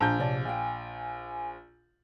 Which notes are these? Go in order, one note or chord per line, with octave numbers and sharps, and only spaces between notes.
A#1 D4 A5 A#5 G6
C3 C#5 D5 A5
D5 F5 G5 G#5